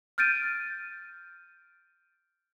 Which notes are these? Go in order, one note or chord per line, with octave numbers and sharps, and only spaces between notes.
F6 G6 A6 D7 D#7